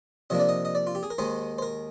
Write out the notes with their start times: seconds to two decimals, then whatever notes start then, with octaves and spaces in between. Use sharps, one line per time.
0.30 C3 F3 A#3 D4 D#5
0.40 D5
0.49 D#5
0.65 D#5
0.75 D5
0.87 F4
0.95 G4
1.03 G#4
1.10 A#4
1.18 D#2 D#3 G#3 D#4 C5
1.58 C5
1.62 A#4